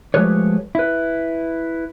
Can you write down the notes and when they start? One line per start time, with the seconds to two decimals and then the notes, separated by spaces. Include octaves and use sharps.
0.14 F3 G#3 A3 G4 B4 C#5
0.75 E4 B4